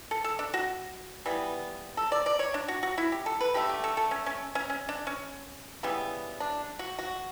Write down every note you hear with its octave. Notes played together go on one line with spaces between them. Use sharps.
A4
A4
D4
F#4
E3 G3 B3
A4
D5
D5
C#5
D4
F#4
F#4
E4
G4
A4
B4
D3 A3 G4
G4
A4
A4
C#4
C#4
C#4
C#4
D4
C#4
C#3 E3 G3 B3
D4
F#4
F#4